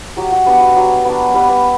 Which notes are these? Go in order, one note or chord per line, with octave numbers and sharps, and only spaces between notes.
F#3 G4
F#4
B3 D4 G4
F#4
F#3 G4
B3 D4
G3 G4 B4
B4 D5